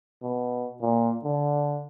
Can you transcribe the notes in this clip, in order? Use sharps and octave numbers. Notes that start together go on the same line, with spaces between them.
B2
A#2
D3